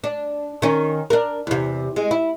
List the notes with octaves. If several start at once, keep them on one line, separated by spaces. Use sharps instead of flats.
D4
D#3 C#4
D4 A#4
E2 C3
G#3
E4